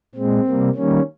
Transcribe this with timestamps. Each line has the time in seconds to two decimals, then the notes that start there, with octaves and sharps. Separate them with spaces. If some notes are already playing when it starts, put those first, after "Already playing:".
0.15 A#2 G#3 C4
0.46 C3 G3 A#3
0.75 D#3 G3 A#3 C#4